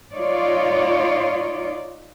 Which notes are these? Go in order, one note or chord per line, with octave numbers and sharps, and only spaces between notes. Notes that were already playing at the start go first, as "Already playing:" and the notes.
D#4 F4 C#5 D5